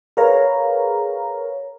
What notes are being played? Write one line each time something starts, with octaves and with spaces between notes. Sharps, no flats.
G#4 A#4 B4 C#5 F5 A#5